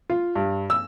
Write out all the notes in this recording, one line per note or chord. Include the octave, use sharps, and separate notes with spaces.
F4
G2
E6